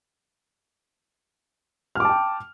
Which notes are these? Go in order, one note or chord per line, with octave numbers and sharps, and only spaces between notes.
G5 A5 D6 F6